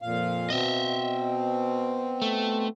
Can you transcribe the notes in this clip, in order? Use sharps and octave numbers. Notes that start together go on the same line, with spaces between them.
F2 A#2 F5
B2 C4 D#5 E5
A3